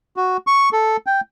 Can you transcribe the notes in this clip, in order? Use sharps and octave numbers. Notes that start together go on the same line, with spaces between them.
F#4
C#6
A4
G5